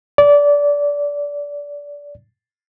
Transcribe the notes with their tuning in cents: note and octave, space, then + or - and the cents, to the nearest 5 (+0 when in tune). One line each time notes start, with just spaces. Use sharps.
D5 -20